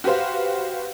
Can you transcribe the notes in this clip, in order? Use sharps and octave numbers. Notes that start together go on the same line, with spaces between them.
F#4 G4 B4 C5 F5